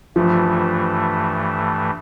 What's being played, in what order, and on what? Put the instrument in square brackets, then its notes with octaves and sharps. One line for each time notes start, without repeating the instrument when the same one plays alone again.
[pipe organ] G2 E3 A3 [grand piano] F3